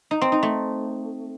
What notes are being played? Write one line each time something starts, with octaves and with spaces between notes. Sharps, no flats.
D#4
C4
D#4
A3